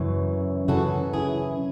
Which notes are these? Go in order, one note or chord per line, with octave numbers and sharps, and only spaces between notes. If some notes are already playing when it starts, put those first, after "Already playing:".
Already playing: F#2 C#3 E3
F#2 C#3 E3 F#4 A4
E4 G#4